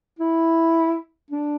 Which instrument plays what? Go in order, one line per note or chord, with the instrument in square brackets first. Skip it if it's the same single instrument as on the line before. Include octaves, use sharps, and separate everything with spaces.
[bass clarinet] E4
D4